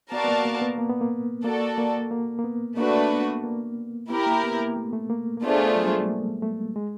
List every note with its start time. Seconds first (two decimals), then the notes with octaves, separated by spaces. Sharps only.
0.12 B3 F#4 A#4 D5 F5 A5
0.24 B3
0.28 A#3
0.45 A#3
0.61 B3
0.78 A#3
0.90 B3
1.01 A#3
1.44 A#3 F#4 A4 D5
1.78 A#3
2.11 A#3
2.39 A#3
2.44 B3
2.77 A3 A#3 D4 F#4 B4
3.11 B3
3.44 A#3
4.09 B3 E4 G4 A#4
4.26 A#3
4.43 B3
4.60 A#3
4.76 A3
4.93 A3
5.10 A#3
5.37 A#3
5.42 A3 B3 D4 F4 G#4 C5
5.76 F#3
5.84 G3
5.92 G#3
6.01 A3
6.09 A#3
6.42 A3
6.76 G#3